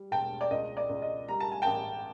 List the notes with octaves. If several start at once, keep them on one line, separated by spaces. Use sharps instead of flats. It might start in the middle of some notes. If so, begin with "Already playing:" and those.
Already playing: G3
E1 G5 A5
D5
C#2 D#5
D5
C#2
D#5
G3 A#5
A5
G#5
A1 G5 A5